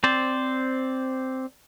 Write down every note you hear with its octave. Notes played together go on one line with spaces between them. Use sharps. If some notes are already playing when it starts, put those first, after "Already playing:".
C4 C5 D5